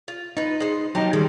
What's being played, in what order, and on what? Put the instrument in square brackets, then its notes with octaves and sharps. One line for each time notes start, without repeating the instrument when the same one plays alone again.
[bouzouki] F4
[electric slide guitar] D#4 [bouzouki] F4 B4
[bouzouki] G#3 C5
[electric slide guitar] F#3 D#4 [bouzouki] G4 A#4 A5
[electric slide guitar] D#3 G3 [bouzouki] G#3 G4